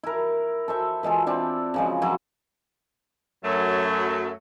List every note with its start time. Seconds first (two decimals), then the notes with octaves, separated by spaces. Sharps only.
0.03 E4 A#4
0.68 A4 C5 E5
1.03 E3 G#3 F4 A4
1.27 C4 D4 E4
1.74 C#3 F3 G#3
2.02 F3 F#3 E4 F5
3.45 F#2 F#3 A3